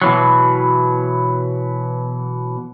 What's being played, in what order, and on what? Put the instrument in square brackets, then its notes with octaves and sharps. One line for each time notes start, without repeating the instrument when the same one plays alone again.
[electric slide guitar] B2 E3 F#3